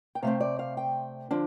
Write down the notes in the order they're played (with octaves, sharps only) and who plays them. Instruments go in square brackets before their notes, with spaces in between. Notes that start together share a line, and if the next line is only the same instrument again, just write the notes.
[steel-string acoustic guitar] G5
C3 A3 C4 F5
D5
F5
G5
D3 F3 D4